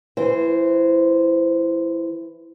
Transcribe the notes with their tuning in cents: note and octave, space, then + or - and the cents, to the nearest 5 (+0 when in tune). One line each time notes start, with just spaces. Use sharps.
E3 +10 C5 -10